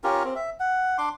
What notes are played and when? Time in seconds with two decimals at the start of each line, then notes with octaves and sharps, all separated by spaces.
0.04 C#4 F4 G4 A#4
0.24 C4
0.35 E5
0.60 F#5
0.98 D4 C6 D6